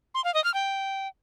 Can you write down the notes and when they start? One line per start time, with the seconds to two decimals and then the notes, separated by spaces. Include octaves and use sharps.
0.14 C6
0.24 F5
0.34 D#5
0.44 F6
0.54 G5